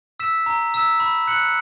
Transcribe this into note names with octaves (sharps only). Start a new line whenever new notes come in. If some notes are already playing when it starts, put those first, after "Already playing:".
E6 B6 E7
A#5
E6 B6 E7
B5
F#6 C#7 F#7